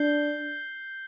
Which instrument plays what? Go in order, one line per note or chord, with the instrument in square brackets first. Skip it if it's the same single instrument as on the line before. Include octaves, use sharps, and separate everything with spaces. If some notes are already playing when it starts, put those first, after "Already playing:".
Already playing: [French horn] D4 [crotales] G6 C7 G7